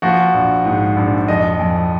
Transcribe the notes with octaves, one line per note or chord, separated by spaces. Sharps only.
F3 F#4
A#1
G#2
A#1
F2 D#5
F2